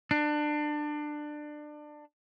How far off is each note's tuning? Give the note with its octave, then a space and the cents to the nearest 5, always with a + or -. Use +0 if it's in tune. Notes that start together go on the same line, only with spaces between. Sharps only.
D4 +25